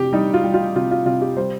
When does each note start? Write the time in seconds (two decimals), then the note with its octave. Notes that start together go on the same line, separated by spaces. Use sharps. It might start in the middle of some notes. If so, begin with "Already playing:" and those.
Already playing: C3 G4
0.13 G3 D#4
0.34 F4
0.44 G3
0.54 F4
0.75 C3 F4
0.91 F4
1.06 C3 F4
1.21 G4
1.37 G3 C5